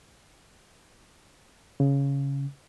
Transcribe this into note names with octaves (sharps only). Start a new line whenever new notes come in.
C#3